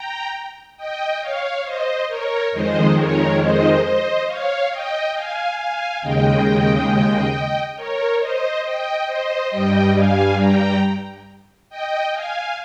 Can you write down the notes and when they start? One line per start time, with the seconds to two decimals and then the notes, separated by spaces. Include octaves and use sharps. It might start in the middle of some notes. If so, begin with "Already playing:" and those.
Already playing: G5 A#5
0.77 D#5 G5
1.21 C#5 F5
1.64 C5 D#5
2.08 A#4 C#5
2.52 F2 D#3 G#3 C5 D#5
2.95 A#4 C#5
3.39 C5 D#5
3.83 C5 D#5
4.27 C#5 F5
4.70 D#5 G5
5.13 F5 G#5
5.57 F5 G#5
6.01 D#2 C#3 G#3 D#5 G5
7.76 A#4 C#5
8.20 C5 D#5
8.64 D#5 G5
9.07 C5 D#5
9.51 G2 G3 D#5 G5
9.95 F5 G#5
10.38 G5 A#5
11.70 D#5 G5
12.13 F5 G#5